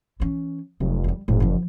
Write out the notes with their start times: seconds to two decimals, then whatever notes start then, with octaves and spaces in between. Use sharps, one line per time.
0.20 E3 C#4
0.80 F1 F#3
1.04 F#3 G3
1.28 F#1 A2
1.40 E3 F3